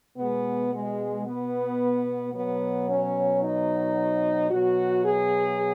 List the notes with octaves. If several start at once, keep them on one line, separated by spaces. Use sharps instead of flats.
B2 G#3 B3
G#3
B3
B2 F#3 B3
C#4
D#4
B2 F#3 F#4
G#4